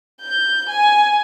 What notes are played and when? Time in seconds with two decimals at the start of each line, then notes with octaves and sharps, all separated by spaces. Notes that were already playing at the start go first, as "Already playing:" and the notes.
0.21 G6
0.69 G#5